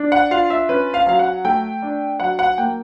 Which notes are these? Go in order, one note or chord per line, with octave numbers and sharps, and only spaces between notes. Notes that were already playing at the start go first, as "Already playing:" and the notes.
Already playing: D4
F#5
F4 F5
E5
C#4 B4
F5
F#3 F5
F#5
A3 G5
D4
F#3 F#5
F#5
A#3 G5